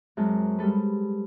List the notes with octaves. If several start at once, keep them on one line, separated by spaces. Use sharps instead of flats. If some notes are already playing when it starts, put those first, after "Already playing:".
F#2 G#3 C4 A5
G3 G#3 A4 B4